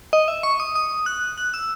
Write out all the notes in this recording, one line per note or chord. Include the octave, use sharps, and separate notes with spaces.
D#5
E5
C#6
D#6
D#6
F#6
F#6
E6